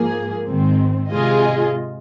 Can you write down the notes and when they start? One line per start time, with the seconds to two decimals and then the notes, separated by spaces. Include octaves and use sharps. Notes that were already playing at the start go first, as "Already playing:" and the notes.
Already playing: G#2 F3 A#3 G#4
0.46 G#1 G#2 D#3 C4
1.11 C3 G#3 F4 G#4 D#5